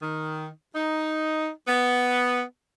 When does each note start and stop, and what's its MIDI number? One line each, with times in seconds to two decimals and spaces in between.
0.02 0.47 51
0.75 1.49 63
1.68 2.41 59